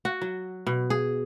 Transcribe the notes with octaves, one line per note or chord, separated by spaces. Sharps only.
F#4
F#3
B2
G#4